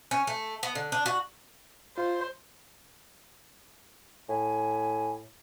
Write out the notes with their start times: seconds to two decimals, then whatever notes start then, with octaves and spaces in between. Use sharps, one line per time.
0.11 C#4
0.27 A3
0.63 B3
0.75 D3
0.92 D4
1.06 F#4
1.98 F4 C5
4.29 A2 G#5